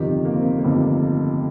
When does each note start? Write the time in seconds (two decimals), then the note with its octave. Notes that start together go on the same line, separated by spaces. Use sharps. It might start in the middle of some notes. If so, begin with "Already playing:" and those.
Already playing: G1 F2 C3 D#3 G4
0.25 A#3
0.33 C4
0.42 A#3
0.59 A#3
0.64 G1 F2 C3 D#3 A3